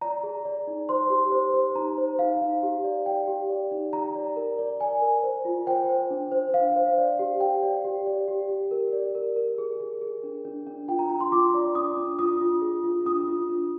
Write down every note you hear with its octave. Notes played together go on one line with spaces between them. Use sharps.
D5 A#5
G#4
D5
D#4
C5 C6
G4
C5
C5
D#4 A#5
C5
D#4 F5
D#4
G4
D5
D5 G5
G4
D5
D#4
D5 A#5
D5
A#4
D5
D5 G#5
A#4
C5
F4
C5 G5
C5
D4
C5
D4 F5
C5
D5
G4
G4 G5
D5
G4
D5
G4
G4
A#4
D5
A#4
A#4
G#4
G#4
G#4
D4
D4
D4
F4 G5
A#5
F4 A#5
C6
F4 D6
D5
D4 D#6
D4
F4 D#6
F4
G#4
F4
D4 D#6
F4
D4